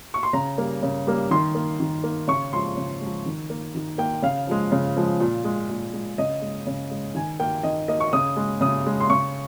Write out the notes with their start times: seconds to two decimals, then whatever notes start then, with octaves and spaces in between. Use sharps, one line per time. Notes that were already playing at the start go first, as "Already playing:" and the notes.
0.14 C#6
0.23 C6
0.33 C#3 A#5
0.58 G3 A#3
0.83 C#3
1.07 G3 A#3
1.31 D#3 C6
1.55 A#3
1.80 D#3
2.04 A#3
2.28 C#3 C#6
2.53 F3 G#3 C6
2.77 C#3
3.01 F3 G#3
3.26 D#3
3.50 A#3
3.75 D#3
3.98 A#3 G5
4.22 C#3 F5
4.47 F3 G#3
4.72 C#3
4.97 F3 G#3
5.20 A#2
5.44 G#3
5.69 A#2
5.93 G#3
6.18 C#3 D#5
6.42 G#3
6.67 C#3
6.91 G#3
7.15 D#3 G#5
7.40 A#3 G5
7.63 D#3 D#5
7.88 A#3 D#5
8.00 C#6
8.13 C#3 D#6
8.36 G#3
8.61 C#3 D#6
8.86 G#3
9.00 C6
9.10 C#3 C#6